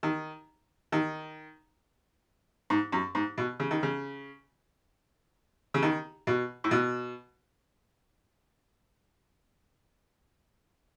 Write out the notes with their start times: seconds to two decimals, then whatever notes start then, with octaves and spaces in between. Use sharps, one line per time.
0.03 D#3
0.92 D#3
2.70 G#2
2.92 F#2
3.15 G#2
3.38 B2
3.60 C#3
3.71 D#3
3.83 C#3
5.74 C#3
5.82 D#3
6.27 B2
6.64 A2
6.71 B2